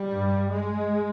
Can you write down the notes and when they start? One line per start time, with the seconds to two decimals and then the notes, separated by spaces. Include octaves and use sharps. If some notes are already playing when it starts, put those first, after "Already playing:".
Already playing: G3
0.10 G2
0.51 G#3